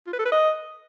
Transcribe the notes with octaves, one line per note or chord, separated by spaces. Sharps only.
F4
B4
A4
B4
D#5